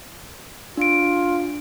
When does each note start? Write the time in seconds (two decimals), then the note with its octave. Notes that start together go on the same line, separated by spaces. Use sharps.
0.77 D4 F4 D7